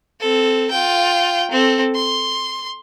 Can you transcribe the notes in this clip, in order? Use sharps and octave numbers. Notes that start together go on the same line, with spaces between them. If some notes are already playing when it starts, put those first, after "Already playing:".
C4 A4
F4 G5
C4 A4
C6